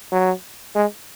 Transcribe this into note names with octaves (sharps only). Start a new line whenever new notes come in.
F#3
G#3